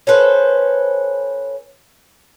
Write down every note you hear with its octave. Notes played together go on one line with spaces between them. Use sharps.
C#4 A4 B4 C5